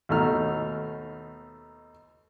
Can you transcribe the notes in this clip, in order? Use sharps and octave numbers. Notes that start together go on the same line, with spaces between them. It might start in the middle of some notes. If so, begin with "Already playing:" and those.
D#2 B2 A3 D#4 F6